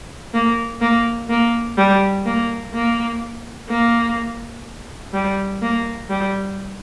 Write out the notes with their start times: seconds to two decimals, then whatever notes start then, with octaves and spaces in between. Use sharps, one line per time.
0.34 A#3
0.81 A#3
1.29 A#3
1.77 G3
2.26 A#3
2.74 A#3
3.69 A#3
5.13 G3
5.61 A#3
6.10 G3